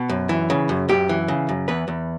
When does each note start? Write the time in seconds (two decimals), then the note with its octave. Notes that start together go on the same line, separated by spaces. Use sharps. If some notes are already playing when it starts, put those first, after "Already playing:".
Already playing: B2
0.09 F#2
0.29 E3
0.50 C#3
0.69 F#2
0.89 F#2 G4
1.09 E3
1.28 C#3
1.49 F#2
1.68 E2 B4
1.88 E2